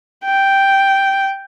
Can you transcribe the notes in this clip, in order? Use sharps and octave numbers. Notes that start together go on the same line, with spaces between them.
G5